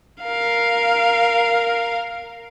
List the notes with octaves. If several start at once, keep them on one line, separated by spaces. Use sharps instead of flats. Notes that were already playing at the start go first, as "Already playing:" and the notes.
A#4 F5